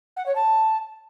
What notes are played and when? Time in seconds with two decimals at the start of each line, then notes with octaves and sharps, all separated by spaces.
0.16 F#5
0.25 C#5
0.35 A5